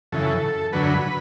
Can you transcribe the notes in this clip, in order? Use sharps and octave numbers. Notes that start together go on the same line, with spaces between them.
F#2 C#3 E3 A4
F#2 D3 F#3 B4